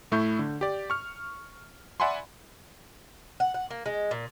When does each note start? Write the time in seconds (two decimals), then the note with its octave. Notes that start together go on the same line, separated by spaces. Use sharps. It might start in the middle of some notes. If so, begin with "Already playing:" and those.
0.12 A2 A3 E4 C#6 G6
0.39 D3
0.61 G4 D5
0.90 C#6 F6
2.00 D5 E5 F#5 G#5 B5 C6
3.40 F#5
3.54 F#5
3.71 A#3
3.86 G#3
4.11 A#2